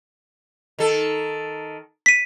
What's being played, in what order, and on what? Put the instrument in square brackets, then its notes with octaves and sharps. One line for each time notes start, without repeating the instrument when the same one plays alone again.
[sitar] D#3 A4
[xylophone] B6 D#7